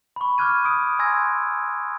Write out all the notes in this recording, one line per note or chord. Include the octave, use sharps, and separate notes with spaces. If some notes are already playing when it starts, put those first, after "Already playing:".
B5 C#6
C#6 D6 F6 F#6 G#6 D#7
D#6 D7
G#5 C6 E6 F#6 G#6 A#6